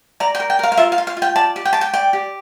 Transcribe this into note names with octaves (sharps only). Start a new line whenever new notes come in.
D5 A#5
G5
A#4
G5
A#4 F5
F5
F4 E5
F5
F4
F5
F4
G5
D5 A5
G4
G5
G4 A5
G5
D5 G5
G4